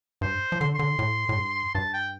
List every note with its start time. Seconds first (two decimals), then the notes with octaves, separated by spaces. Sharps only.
0.21 G2 C5
0.52 F3
0.60 D3 C6
0.75 D3 C6
0.99 A2
1.29 A2
1.36 G2
1.75 G2 A5
1.94 G5